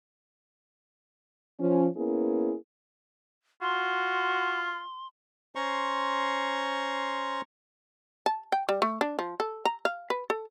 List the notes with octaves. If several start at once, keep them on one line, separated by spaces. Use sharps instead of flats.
F3 C#4
A#3 B3 C#4 E4 G#4
F4 F#4 C6
C#4 C5 A#5 C6 C#6
A5
G5
G3
A3
D4
F3
A4
A#5
F5
B4
A4